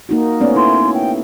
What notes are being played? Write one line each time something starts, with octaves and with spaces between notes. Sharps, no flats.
A#3 D#4 F#4
A3 B3 C#4 D5
E4 C6
G5